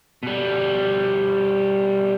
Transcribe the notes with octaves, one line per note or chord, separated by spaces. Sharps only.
B2 G3